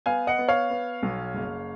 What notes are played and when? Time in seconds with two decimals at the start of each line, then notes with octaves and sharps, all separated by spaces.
0.06 B3 F5 G#5
0.27 D#5 F#5
0.38 B3
0.48 C#5 F5
0.70 B3
1.03 B1
1.34 F#1